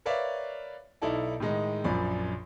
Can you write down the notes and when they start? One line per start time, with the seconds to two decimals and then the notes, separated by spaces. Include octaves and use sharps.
0.05 A#4 B4 C#5 D5 E5 F5
1.02 B1 D#4 E4 A4 D5 A5
1.40 A2 D#3 G#3 D#4
1.84 A#1 F#2 F3 D5 B5